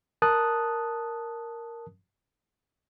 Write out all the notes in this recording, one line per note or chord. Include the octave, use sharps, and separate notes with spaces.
A#4 A5 D#6 F#6